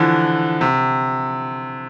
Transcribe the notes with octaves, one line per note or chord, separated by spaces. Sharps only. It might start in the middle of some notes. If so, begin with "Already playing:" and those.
Already playing: D3 E3 F3
C3